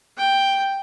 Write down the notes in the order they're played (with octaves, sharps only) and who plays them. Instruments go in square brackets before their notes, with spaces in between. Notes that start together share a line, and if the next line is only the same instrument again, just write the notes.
[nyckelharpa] G5